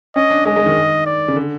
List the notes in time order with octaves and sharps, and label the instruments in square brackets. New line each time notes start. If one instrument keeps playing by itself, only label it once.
[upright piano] C#4 [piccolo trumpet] D#5
[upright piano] D4
[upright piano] G#3 [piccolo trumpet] D#5
[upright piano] G#3
D#3
[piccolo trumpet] D5
[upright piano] C#3
D3